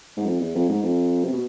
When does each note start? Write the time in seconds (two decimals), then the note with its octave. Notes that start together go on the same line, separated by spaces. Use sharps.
0.17 G#2
0.26 F2
0.40 E2
0.55 F2
0.69 G#2
0.83 F2
1.24 C3
1.33 B2